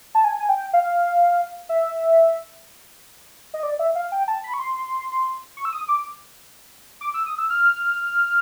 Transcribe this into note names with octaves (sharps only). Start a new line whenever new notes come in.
A5
G#5
G#5
G5
F5
E5
D#5
D5
E5
F5
G5
A5
B5
C#6
C6
C#6
E6
D#6
D6
D6
E6
D#6
E6
F6